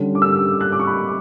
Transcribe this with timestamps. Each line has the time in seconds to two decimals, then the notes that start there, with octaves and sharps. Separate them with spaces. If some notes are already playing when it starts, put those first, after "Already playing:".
Already playing: D3 G3 C#4
0.15 D6
0.22 E6
0.61 F#6
0.72 D6
0.79 C#6
0.87 B5